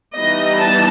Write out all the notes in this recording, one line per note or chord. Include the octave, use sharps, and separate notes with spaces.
E3 G3 B3 D#4 D#5
A5